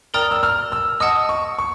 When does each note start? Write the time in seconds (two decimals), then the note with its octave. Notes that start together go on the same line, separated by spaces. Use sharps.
0.14 A#4 D5 G5 A#5 D#6 F6
0.31 E6
0.43 F6
0.72 E6
1.00 D#5 F#5 A5 D#6
1.29 C#6
1.59 C#6